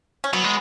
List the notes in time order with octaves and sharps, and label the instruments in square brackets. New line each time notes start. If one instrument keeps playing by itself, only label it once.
[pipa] C#4
[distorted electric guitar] F#3 [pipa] B3
[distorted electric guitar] G#3